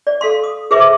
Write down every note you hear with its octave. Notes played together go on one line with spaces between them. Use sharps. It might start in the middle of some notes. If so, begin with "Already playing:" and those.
D5
A4 F5 C6
D#6
G#4 B4 C5 E5 D6